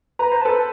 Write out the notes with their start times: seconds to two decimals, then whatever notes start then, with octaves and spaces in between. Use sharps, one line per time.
0.19 B4 A#5
0.32 C5
0.41 A4 B4 A5